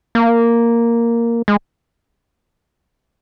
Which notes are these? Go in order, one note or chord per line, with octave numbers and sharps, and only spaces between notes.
A#3
G#3